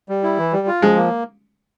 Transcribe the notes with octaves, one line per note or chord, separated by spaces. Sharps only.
G3
E4
E3
G3
F4
F3 G#3
A#3